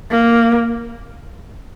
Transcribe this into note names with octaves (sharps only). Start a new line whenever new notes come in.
A#3